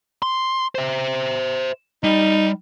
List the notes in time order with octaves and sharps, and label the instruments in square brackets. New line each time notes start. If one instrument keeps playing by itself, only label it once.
[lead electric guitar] C6
C5 E5
[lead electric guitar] G3 [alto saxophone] D#4